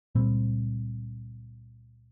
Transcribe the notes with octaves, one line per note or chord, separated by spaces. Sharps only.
C#2 A#2 G3 C4